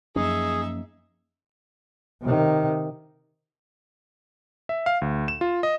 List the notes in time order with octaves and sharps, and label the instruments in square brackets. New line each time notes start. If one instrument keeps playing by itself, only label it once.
[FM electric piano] F#2 [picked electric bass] F3 A#3 C#4 [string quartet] D#4 E5 [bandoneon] G#4
[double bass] C3 D#3
[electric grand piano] E5
F5
D2
E7
F4
D#5